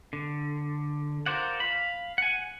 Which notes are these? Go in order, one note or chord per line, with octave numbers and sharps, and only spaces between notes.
D3
F4 A#4 C5 D5 F#5
F5 B5
F#5 G#5